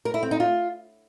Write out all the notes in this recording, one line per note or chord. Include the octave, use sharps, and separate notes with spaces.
A#4
E4
C4
D#4
F4